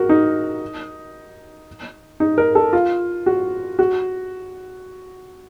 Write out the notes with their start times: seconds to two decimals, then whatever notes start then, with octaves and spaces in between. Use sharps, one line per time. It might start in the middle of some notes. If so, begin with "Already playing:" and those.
Already playing: F#4 A#4
0.09 D#4
2.20 D#4
2.38 A#4
2.55 A4
2.73 F4
3.26 F#4
3.79 F#4